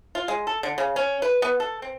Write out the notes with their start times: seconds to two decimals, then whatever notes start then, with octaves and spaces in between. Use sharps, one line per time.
0.15 F4
0.28 G#3
0.47 A4
0.63 D3
0.78 C#3
0.96 C#4
1.22 B4
1.42 B3
1.60 A4
1.82 C4